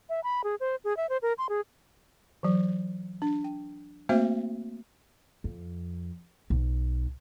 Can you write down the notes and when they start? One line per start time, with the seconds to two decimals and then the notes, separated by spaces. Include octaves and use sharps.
0.09 E5
0.24 B5
0.44 G#4
0.60 C5
0.84 G#4
0.97 E5
1.09 C5
1.22 A#4
1.38 C6
1.49 G#4
2.43 E3 F#3
3.22 D4
3.44 G5
4.09 A3 A#3 C4 F#4 C5 E5
5.44 F2
6.50 B1